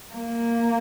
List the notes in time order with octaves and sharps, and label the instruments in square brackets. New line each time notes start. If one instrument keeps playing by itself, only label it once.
[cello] A#3